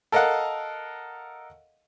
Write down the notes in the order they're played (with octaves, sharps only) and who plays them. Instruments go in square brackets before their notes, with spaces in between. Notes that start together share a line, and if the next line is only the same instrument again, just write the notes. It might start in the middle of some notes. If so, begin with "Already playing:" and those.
[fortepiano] A4 A#4 D#5 F5 F#5